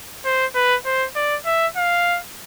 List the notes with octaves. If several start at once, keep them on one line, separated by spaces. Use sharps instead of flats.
C5
B4
C5
D5
E5
F5